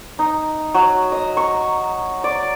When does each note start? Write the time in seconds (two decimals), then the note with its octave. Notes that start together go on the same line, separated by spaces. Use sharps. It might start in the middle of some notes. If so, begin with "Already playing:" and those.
0.19 D#4
0.74 F#3
1.12 D#5
1.37 C#6
2.24 D5